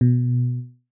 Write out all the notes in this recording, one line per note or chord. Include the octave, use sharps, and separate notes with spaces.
B2